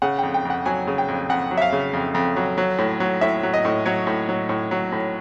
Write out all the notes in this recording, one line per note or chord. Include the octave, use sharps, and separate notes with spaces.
C#3 F#5
F2 G5
G5
F2
F#5
F#3 G#5
C#3
G5
F2
F2 F#5
F#3
E5
F5
C#3
F2
F2
F#3
F#3
A2
F#3
A2 E5
F#3
D#5
A2
F#3 C#5
A2
F#3
A2
F#3
A2